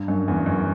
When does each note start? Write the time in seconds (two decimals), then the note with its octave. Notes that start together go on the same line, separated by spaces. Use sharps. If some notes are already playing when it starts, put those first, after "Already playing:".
Already playing: G2
0.08 F#2
0.28 E2
0.46 F#2